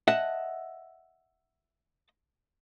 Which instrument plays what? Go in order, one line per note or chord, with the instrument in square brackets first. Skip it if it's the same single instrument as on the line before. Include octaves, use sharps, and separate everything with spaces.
[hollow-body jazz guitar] D#5 E5 F#5 A5